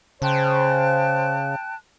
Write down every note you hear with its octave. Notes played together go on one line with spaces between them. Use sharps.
C#3 C5 G5 A5 F#6